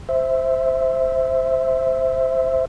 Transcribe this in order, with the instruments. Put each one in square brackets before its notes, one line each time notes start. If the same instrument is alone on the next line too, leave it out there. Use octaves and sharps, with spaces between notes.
[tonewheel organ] C5 E5